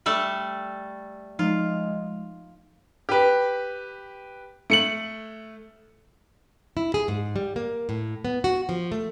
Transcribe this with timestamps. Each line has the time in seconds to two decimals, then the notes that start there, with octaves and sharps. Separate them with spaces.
0.06 G3 A3 A4
1.39 F3 G#3 D#4 F4
3.09 G4 B4
4.70 A3 C#7 F#7
6.77 E4
6.94 G#4
7.08 G#2
7.36 G3
7.56 A#3
7.89 A2
8.25 B3
8.44 F#4
8.69 F3
8.92 A3